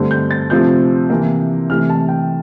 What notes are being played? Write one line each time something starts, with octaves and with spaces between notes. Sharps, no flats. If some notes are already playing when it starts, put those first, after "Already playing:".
Already playing: G2 D3 A3 C4
G6
A6
C3 F3 A3 C4 G6
C3 E3 A#3
C3 E3 A3 F6
A5
G5